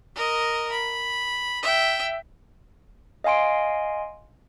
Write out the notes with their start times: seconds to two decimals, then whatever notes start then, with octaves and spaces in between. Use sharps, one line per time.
0.16 A#4 D#5
0.72 B5
1.63 E5 G5
3.24 D#5 F5 G#5 C6 D7